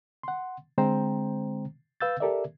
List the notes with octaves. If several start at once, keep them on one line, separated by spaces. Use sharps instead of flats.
F#5 C6
D3 G#3 C4 C5 G5 A#5
B4 F5 E6 G6 A6
G4 A4 A#4 D5 E5